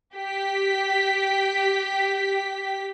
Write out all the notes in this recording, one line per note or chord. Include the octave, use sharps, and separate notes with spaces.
G4 B6